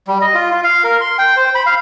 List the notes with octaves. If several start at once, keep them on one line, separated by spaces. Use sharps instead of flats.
G3
D#5
F4
F4
F5
A#4
C6
G5
C5
B5
F5